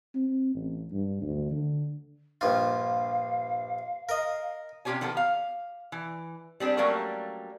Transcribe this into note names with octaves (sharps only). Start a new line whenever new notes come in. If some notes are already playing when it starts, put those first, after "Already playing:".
C4
A1
G2
D2
D3
A#1 G2 F4 F5
A#4 D#5
C3 C#4 F4 G4 C#5 G#5
D#3 F3 B3 A4
F5
E3
G3 C4 D4 G#4
F#3 G3 A3 A#3 C#4 A#4